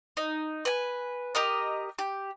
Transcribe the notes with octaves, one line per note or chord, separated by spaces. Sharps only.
D#4
B4 G#5
G4 A#4 D#5
G4